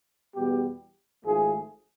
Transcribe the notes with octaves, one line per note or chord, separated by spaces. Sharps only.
E2 B2 G3 B3 G4
G#1 G#2 F3 A3 G#4